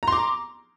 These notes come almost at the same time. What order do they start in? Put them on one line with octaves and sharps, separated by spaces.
A#5 C6 D6